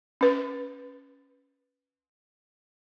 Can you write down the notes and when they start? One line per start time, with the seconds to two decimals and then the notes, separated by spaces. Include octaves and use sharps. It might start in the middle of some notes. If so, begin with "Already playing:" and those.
0.21 C#4 B4